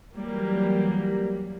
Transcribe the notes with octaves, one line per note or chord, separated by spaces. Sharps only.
E3 F#3 G3 A#3